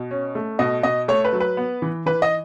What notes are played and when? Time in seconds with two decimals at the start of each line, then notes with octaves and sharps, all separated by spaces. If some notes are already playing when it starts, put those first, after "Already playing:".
Already playing: B2
0.11 C#4
0.35 A3
0.59 B2 D#5
0.83 B2 D#5
1.08 A3 C#5
1.25 B4
1.33 F#3
1.40 B4
1.57 B3
1.82 E3
2.06 E3 B4
2.22 D#5